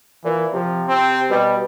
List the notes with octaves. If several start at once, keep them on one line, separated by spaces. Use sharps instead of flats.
A#2 E3
C3 F3
C4
B2 G3